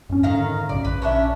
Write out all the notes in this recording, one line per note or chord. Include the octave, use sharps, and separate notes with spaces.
F#2 C#4
G#2 D3 D#3 F5 A#5
B1 F#2 C#3 D5
A#1 B4
C#4 D4 E5